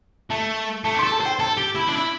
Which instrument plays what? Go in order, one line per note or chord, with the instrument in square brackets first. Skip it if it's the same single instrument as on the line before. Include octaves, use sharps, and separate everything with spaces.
[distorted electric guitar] A3 [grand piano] A5
[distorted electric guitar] A3 [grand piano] A5
[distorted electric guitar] G4
[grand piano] C6
[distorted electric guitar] A4
[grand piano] A5
[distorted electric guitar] C5
[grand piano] G5
[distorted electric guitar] A4 [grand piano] A5
[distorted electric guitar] G4
E4
D4
E4